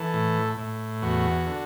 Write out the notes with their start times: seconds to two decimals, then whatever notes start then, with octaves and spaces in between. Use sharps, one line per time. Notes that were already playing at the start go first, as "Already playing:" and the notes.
Already playing: E3 A4
0.13 A2
0.58 A2
1.02 E2 F#4
1.46 D3